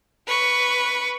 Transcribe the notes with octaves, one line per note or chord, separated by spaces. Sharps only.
B4 C#6